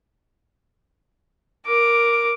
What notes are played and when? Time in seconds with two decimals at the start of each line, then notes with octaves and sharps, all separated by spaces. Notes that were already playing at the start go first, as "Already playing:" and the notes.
1.66 A#4 D6